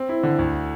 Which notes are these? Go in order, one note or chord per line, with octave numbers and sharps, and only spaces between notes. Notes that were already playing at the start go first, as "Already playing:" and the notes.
Already playing: C4
E4
D3
D2